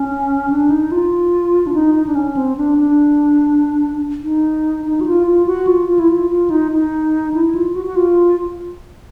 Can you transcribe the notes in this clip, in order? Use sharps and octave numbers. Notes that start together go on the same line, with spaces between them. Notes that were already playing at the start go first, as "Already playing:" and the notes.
Already playing: C#4
D4
D#4
F4
D4
D#4
D#4
D4
C#4
C4
D4
D4
D#4
D#4
F#4
F4
F4
F#4
F4
F4
E4
F4
F4
D#4
D#4
E4
F4
F#4
F#4
F4